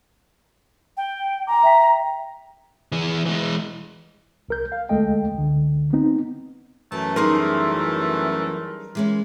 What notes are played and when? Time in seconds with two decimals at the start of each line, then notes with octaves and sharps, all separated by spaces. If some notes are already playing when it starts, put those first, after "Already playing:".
0.97 G5
1.47 G#5 A#5 D6
1.63 E5 G5 B6
2.92 E3 G#4
3.26 E3 G#3
4.49 C2 A#4 G6
4.72 F5
4.89 D2 G#3 A3 A4 D#5 G5
5.34 C#2 D3
5.93 B3 C4 D#4
6.92 F#2 E3 A3 A5
7.16 G3 D#4 G#4 A#4 C6
8.95 E3 G#3 C#4